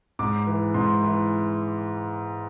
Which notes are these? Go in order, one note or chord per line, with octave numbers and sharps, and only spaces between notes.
G#2 D6
E3
G#2 C6
E3